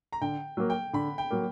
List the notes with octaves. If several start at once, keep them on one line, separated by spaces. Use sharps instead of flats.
A#5
D3 G5
F#3 A#3
G5
D3 B5
G5
F#3 A#3